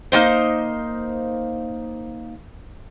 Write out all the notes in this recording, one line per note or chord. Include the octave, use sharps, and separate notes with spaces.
A#3 C#4 D#4 C5